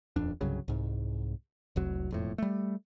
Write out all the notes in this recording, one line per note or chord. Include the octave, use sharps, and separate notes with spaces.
D#1 F2 D4
C2 G2 C#3 F#3
C2 G#2
F1 C2 F#3
E1 F2 A2
G3 A3